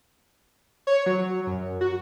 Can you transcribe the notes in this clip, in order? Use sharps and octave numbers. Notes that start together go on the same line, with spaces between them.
C#5
F#3
F#2
F#4